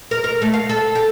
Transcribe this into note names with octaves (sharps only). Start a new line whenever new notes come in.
A#4
A#4
A3
F5
A4
G4